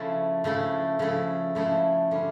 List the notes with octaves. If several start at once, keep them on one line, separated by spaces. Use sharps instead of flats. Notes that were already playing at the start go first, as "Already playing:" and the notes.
Already playing: C#3 F3 A3 E4 A4
C#3 F3 A3 E4 A4
C#3 F3 A3 E4 A4
C#3 F3 A3 E4 A4
D3 G3 C#4